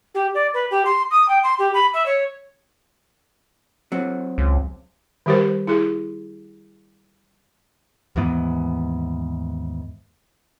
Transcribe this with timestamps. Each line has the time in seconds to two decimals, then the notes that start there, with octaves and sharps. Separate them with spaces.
0.14 G4
0.34 D5
0.54 B4
0.70 G4
0.85 C6
1.10 D#6
1.28 G5
1.43 C6
1.58 G4
1.74 B5
1.93 E5
2.06 C#5
3.92 F#3 C4
4.38 C#2
5.26 D#3 G3 G4 A#4 C5
5.67 E4 G#4
8.16 D#2 G#2 E3 B3